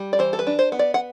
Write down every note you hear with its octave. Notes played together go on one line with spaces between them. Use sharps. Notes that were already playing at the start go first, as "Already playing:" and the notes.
Already playing: G3
D5
E3 C5
A4
B4
D4
C5
B3
D5
F#5